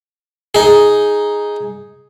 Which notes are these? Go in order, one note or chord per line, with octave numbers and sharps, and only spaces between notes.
D#4 G#4